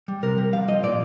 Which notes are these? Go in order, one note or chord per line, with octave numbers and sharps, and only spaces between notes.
G3
C3 A#4
G3
F3 F5
F3 D#5
A#2 D5